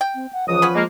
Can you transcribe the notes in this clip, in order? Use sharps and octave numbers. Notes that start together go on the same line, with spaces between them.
G5
C4
F#5
C#2 E3 F3 D#6
B3 C#4 B4
G#3 A#3